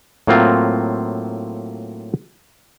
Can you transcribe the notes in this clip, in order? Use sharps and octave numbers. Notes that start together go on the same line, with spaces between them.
A2 F#3 A#3 C4 F4